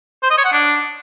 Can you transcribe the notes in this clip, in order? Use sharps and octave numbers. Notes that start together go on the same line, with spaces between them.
C5
D#5
C#5
F#5
D4